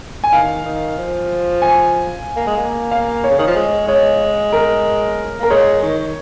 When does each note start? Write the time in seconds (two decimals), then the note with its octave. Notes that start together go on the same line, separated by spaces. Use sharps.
0.24 G#5
0.32 D#3 F5
0.65 D#3
0.98 F3
1.62 G#5
2.36 A#3
2.47 G#3
2.57 A#3
2.91 F5
3.24 C#5
3.30 C#3
3.39 D#3
3.47 F3
3.55 G#3
3.88 G#3 C#5
4.53 A#4
5.40 A#3 A#4
5.50 G#3 C#5
5.83 D#3